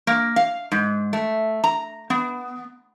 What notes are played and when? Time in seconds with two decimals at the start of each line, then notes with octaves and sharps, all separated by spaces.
0.07 A#3
0.36 F5
0.72 G#2
1.13 A3
1.64 A#5
2.10 B3